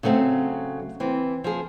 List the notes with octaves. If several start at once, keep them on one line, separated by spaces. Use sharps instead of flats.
C#3 F#3 A3 C4
E3 C4
F3 G#4